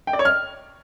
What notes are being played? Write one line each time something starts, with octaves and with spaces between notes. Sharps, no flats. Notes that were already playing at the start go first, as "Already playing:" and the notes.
G5
D5
C#5
F6